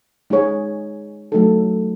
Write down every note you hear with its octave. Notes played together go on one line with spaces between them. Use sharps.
G#3 D#4 G#4 C#5
F#3 A3 D#4 A4